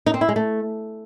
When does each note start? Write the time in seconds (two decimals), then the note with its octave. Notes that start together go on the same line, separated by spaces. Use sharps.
0.06 D#4
0.14 C4
0.21 E4
0.29 G#3
0.36 A3